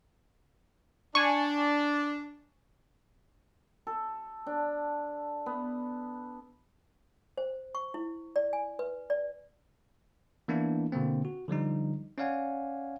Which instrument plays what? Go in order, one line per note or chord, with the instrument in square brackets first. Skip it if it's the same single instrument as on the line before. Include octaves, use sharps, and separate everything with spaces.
[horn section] D4 [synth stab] G#5 C#6
[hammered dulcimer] A4
D4
B3
[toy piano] C5
C#6
E4
D5
G#5
B4
D5
[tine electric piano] E3 A#3 B3 D4 E4
B2 D3 A#3 C4
F#4
D3 F3 G3 D#4
C#4 C#5 D5 F5 F#5 G#5